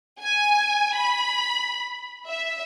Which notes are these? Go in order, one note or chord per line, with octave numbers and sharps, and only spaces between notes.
G#5
B5
E5